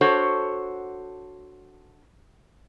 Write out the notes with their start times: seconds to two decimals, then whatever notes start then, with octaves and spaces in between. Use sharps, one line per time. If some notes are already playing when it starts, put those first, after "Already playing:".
0.01 D4 F#4 A4 C5 C#5 F#5